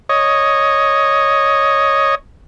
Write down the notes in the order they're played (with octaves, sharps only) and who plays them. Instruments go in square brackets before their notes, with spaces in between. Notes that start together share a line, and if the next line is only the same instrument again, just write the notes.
[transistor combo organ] C#5 D#5